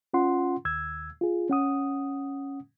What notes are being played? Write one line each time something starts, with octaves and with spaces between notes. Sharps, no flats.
C#4 F4 F#5 C6
D#2 E6 G#6
F4 G#4
C#4 F#5 D#6